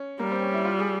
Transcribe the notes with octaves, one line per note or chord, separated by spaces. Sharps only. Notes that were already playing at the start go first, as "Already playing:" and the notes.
Already playing: C#4
G3 A#3
C4
C#4
E4
F4
G#4